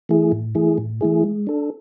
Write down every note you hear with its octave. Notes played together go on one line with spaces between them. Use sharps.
E3 A3 E4 G#4
A2
E3 A3 E4 G#4
A2
E3 A3 E4 G#4
G#3
D4 A4